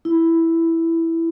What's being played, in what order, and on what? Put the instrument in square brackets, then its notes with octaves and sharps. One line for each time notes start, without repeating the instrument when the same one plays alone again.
[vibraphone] E4